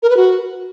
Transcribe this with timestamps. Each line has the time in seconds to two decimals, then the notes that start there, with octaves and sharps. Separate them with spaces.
0.03 A#4
0.10 B4
0.17 F#4